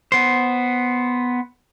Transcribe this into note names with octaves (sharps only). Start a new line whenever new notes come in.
B3 C5